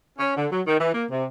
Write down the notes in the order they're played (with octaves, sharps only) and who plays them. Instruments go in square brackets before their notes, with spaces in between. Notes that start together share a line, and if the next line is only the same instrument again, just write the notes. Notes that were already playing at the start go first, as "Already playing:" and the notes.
[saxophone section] C#4
D3
F#3
D#3
E3
A#3
C3